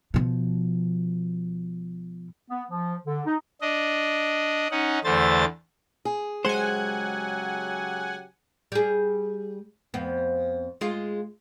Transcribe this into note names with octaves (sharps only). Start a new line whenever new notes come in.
B2 F3
B3
F3
D3
D#4
D4 D#5
C#4 D#4 F#5
E2 D3 A3 C5 A6
G#4
C#3 F#3 G#3 G4 C5 F#5 G#5
G3 G#4
F2 B3
G#3 F4